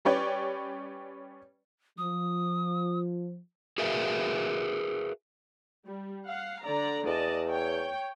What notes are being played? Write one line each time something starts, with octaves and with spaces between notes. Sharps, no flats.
G3 C#4 B4 C#5 D5 G5
F3 D#6
F#4 G#4 A#4 B4 E5 F5
G3
F5 F#5
D3 D5 A#5
E2 D5 D#5 A5
C#5 G5